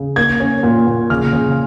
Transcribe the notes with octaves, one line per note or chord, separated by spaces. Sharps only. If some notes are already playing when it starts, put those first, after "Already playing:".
Already playing: C#3
A#3 G#6
C#4
A#2
A#2
C#3 F6
C#3